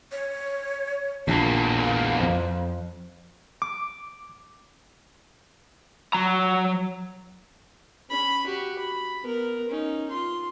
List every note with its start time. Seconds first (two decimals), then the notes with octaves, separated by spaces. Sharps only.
0.12 C#5
1.28 A#1 E2 A#3 A5
1.81 F5
2.16 F2
3.62 D6
6.13 F#3 A#5
8.10 C#4 B5
8.46 F#4 G4
8.79 B5
9.22 B3 A#4
9.68 C#4 D#4
10.11 F4 C6